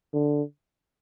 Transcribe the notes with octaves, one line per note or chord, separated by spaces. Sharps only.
D3